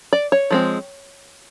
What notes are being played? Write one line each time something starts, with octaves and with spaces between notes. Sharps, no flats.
D5
C#5
F3 G#3 C4